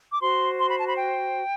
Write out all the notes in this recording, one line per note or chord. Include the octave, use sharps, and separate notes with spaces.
D6
F#4 C5 C6
C6
B5
A5
B5
G5